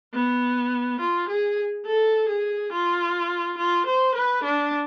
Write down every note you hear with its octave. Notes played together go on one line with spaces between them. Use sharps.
B3
F4
G#4
A4
G#4
F4
F4
C5
B4
D4